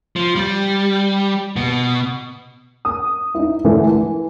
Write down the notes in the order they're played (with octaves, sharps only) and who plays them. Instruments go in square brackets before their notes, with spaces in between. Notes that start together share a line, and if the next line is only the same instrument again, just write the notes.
[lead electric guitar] F3
G3
B2
[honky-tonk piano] D#6
D#4 E4
D3 E3 A3 D4 E4
E3